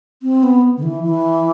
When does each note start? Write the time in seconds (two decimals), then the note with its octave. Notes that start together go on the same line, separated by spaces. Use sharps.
0.23 C4
0.43 B3
0.77 D3
0.83 E3
1.03 E3